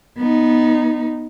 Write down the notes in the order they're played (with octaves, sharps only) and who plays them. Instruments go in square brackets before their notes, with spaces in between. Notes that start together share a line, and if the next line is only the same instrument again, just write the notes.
[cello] B3 D#4